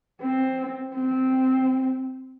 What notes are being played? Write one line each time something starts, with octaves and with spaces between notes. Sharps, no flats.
C4
C4